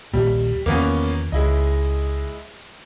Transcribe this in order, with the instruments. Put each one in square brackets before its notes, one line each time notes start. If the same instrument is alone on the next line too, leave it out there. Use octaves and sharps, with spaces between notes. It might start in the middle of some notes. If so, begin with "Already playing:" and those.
[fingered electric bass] A#1 D#2 A#2 [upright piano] G3
[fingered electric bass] E2 D#3 F3 [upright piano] A#3 B3 C#4
[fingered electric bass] C#2 [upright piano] G#3 E4 D#5